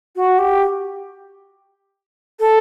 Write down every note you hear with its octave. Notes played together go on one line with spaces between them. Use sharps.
F#4
G4
A4